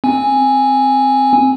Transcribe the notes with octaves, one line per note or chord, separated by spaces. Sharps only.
C4 G#5